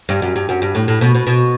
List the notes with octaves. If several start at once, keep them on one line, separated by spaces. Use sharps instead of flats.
G2
F#2
G2
F#2
G2
A2
A2
B2
B2
B2